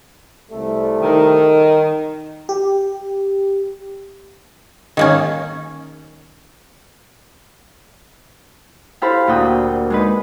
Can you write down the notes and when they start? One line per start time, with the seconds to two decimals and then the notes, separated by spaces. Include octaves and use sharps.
0.51 C2 G3 A3
1.03 D#3
2.49 G4
4.97 D#3 A#3 C#4
9.01 E4 G4 A4 C5 F5 B5
9.27 D2 A#2 F#5 G5 D#6
9.90 G#3 D#4 B4